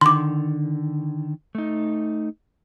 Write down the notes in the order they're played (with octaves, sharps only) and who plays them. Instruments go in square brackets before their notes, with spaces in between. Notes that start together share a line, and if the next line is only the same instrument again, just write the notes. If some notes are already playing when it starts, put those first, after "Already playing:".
[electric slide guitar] D3 D#3 [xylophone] C6 D6
[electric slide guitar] A3 D#4